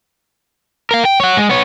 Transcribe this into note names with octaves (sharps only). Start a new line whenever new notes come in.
A#4 F5
G5
C#5 F#5
G#3
B3 C#5